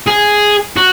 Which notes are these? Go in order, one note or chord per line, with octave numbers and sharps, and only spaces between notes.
G#4
F#4